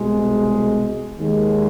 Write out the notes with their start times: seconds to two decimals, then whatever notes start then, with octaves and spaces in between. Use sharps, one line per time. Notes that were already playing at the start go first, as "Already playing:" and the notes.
Already playing: C2 B2 G#3
1.17 D#2 D#3 G#3